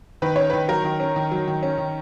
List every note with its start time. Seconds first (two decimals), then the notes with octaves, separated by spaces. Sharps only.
0.22 D#3 B4
0.36 C#4 C#5
0.50 D#3 B4
0.68 F#3 A#4
0.84 D#3
1.00 C#4
1.16 D#3
1.32 F#3
1.48 D#3
1.63 C#4
1.78 D#3